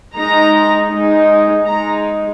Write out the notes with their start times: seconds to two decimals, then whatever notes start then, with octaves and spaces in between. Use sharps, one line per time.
0.14 G#3 D#4 A#5
0.90 G#3 D#4
1.66 G#3 D#4 A#5